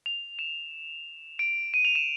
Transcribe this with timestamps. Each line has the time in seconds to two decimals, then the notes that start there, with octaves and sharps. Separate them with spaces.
0.06 F7
0.39 E7
1.39 D7
1.74 D#7
1.85 F7
1.95 E7